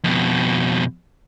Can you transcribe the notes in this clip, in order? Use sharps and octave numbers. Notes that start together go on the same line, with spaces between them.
F2 B2